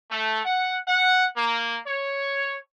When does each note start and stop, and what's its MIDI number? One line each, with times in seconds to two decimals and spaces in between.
0.11 0.41 57
0.45 0.78 78
0.88 1.26 78
1.37 1.77 58
1.87 2.56 73